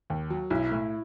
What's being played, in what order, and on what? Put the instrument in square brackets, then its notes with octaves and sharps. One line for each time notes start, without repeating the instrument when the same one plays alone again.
[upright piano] D#2
F#3
[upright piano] B1 [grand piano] E4
[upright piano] A2